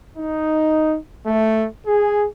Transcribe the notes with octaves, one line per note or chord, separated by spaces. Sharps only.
D#4
A3
G#4